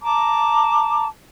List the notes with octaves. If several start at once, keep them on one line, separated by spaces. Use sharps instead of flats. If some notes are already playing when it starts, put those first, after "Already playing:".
A5 A#5 D6